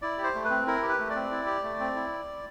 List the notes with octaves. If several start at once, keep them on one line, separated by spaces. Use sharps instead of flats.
E4 D5
G4
C5
A3
B4
C4
E4 A#4
G4
B4
A3
C4 D5
E4
G4
A3
C4
E4